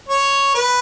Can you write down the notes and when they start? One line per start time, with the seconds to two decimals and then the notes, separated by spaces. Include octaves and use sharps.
0.09 C#5
0.55 B4